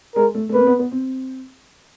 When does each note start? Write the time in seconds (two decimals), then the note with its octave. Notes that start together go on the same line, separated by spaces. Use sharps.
0.16 G#3 A#4
0.35 A3
0.49 A3
0.54 A#3 B4
0.60 C4
0.67 B3
0.79 B3
0.92 C4